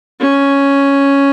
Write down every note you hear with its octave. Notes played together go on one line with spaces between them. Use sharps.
C#4